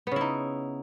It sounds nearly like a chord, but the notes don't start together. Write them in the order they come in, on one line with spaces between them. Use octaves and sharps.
B3 C#3 E4 D#4